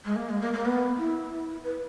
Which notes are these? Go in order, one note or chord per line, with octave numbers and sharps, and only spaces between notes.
G#3
A#3
G#3
A#3
A#3
B3
E4
B4